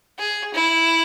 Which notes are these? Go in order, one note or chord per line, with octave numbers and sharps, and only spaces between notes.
G#4
E4